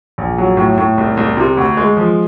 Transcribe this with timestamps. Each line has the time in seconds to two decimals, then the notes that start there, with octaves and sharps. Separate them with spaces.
0.18 A#1
0.38 F#3
0.57 A2
0.78 A2
0.98 C2
1.17 C2
1.37 C3
1.57 D2
1.77 G#3
1.97 F3